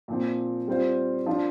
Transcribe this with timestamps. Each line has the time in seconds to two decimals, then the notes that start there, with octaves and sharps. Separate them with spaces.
0.08 A#2 F3 C4
0.68 G3 C4 F4 C5
1.26 F3 D4 F4 C5